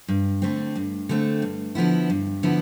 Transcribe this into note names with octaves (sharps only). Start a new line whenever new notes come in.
G2
D3 A3 C4
G2
D3 A3 C4
G2
D3 F3 B3 E4
G2
D3 F3 B3 E4